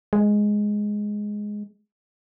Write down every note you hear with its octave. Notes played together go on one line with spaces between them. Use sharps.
G#3